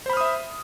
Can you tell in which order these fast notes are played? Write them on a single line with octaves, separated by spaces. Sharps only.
C5 B5 F6 D#6 E5